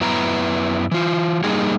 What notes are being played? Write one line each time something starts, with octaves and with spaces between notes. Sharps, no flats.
F#2 B3 E4 B4 A#5
E3 F4
G3 A#3 D#4 G#4